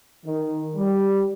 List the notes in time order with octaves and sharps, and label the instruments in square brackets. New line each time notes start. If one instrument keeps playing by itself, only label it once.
[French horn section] D#3
G3